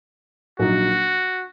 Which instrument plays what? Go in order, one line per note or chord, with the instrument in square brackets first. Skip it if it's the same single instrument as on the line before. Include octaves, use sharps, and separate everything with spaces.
[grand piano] A#1 A#2 F#3 A#3 D#4 [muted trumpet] F#4